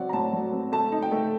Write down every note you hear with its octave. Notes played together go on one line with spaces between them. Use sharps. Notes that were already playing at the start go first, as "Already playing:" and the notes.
Already playing: F#3 C4 D5 F#5
A#5
A2 A5
F#3
C4
A3 A5
D#4
G5
A3